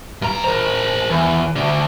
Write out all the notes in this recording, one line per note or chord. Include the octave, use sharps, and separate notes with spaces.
G2 A#5
A#4 C5
E2
D2 D3